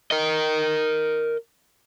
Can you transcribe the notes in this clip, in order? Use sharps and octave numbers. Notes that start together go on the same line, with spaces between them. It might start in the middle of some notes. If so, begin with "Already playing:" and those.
A#4 D#5